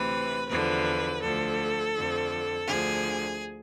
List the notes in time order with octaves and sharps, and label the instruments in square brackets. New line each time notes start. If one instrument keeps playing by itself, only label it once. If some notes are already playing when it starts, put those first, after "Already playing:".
Already playing: [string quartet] D2 C3 E3 B4
E2 D3 F3 B4
D2 D3 F3 A4
F2 D3 F3
D2 D3 F3 G#4